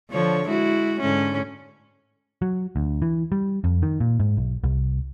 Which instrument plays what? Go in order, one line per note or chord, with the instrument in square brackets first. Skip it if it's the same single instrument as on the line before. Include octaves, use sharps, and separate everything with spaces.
[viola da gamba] D3 F3 C#5
G#3 E4 F#4
G#2 D3 C#4
[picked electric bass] F#3
D2
E3
G3
F2
D#3
A#2
G#2
B1
C2